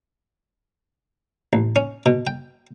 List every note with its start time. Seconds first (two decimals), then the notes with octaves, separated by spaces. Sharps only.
1.53 A1
1.76 C#4
2.06 B2
2.27 G5